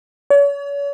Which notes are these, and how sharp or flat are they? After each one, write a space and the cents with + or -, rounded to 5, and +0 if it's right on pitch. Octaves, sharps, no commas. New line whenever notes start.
C#5 +40